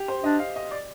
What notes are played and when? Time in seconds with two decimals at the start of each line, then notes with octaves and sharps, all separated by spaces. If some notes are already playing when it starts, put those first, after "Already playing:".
Already playing: G4
0.08 C5
0.24 D4 D#5
0.39 F5
0.56 D#5
0.71 D5